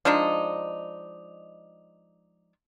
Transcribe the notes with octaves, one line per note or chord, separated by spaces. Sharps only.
F3 G#3 D4 D#4